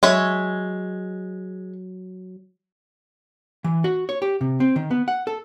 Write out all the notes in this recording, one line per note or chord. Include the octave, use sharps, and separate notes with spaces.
F#3 G#3 C#5 E5
E3
F#4
C#5
G4
C3
C4
D#3
B3
F#5
A4